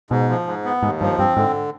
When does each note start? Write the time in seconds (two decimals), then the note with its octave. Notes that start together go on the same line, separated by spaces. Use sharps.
0.10 G#2 B2
0.29 F3
0.47 G#2
0.65 B3
0.83 D#2 G#2
1.01 G2 F3
1.19 G2 C4
1.37 G#2 D3